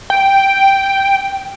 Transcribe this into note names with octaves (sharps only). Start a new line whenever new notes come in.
G5